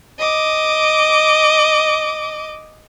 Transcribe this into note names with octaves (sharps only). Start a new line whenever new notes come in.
D#5 D6